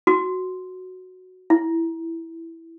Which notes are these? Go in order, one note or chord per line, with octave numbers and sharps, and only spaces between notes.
F#4
E4